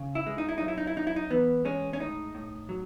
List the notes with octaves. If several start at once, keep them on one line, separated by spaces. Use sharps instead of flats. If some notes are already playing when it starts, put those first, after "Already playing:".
Already playing: C#3
E4
G#3
D#4
E4
F#2 D#4
E4
D#4
E4
F#2 D#4
E4
D#4
E3 B3
G#3 C#4
C#4
A2 D#4
A2
F#3